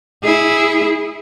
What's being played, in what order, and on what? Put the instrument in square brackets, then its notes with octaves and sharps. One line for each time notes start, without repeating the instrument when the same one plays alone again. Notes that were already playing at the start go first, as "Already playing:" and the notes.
[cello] E4 G#4